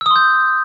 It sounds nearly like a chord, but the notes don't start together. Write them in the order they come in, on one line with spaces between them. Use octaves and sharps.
E6 D#6 C6 G6